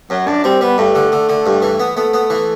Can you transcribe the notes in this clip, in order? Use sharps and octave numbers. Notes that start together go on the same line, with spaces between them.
F#2 F#3
F#2 D4
G3 C4
G3 B3
G2 A3
D3
D3
D3
G2
E3
B3
A3 B3
B3
E3